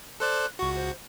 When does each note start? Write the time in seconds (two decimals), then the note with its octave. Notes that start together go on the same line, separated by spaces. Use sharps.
0.20 A4 C5 D5 F#6
0.59 C#2 F#4 C#6
0.76 C5